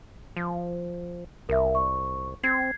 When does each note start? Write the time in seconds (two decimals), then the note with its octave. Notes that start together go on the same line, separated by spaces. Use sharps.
0.37 F3
1.49 C2 A#4 E5
1.75 C#6
2.43 C4 G#6 C7